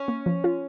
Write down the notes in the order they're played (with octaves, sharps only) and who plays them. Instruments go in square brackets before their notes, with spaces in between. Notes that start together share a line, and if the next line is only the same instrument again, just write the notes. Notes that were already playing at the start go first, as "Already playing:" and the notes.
Already playing: [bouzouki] C#4
[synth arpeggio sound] A#3
F3
F4